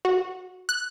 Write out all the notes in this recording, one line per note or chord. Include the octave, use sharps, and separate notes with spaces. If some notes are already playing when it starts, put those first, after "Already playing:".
F#4
F#6